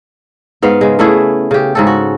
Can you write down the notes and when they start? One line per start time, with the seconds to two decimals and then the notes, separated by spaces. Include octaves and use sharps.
0.62 G#2 B3 F5
0.81 C#3 G#3
0.99 C#3 A3 E4 G#4
1.51 C#3 G4
1.75 G#2 C#3 A4
1.87 F#4